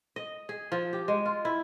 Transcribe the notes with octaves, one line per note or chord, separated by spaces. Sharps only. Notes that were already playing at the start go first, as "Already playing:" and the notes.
D#5
G#4
F3
G4
G#3
F4
E4